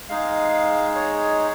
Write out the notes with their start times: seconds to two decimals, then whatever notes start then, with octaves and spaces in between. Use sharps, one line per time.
0.09 G#3 D#4 G#4 F5
0.96 C#5